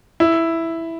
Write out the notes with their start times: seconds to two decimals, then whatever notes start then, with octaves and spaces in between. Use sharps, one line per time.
0.20 E4